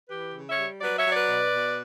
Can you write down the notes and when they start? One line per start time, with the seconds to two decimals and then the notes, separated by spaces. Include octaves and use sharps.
0.09 E3 G4 B4
0.33 C#3
0.49 C#5 E5
0.57 G3
0.81 F#3 B4 D5
0.97 C#5 E5
1.05 F#3
1.12 B4 D5
1.29 B2
1.54 B2